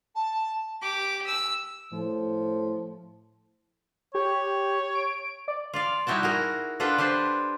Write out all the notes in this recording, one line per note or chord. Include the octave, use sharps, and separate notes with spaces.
A5
G4 D6
E6
A2 F3
G4 C#5
D7
D5
F4 D5 F5
G3 D#4 E4 F#4 G5 A5
F#4 G#4 A#4
D4 F4 A4 B4 F#5 G5
D4 G4 B4 C5